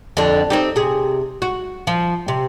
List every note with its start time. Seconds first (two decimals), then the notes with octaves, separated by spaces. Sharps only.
0.17 F2 D3
0.50 C4 D#4 G4
0.76 C3 G#4
1.42 F#4
1.87 F3
2.28 C3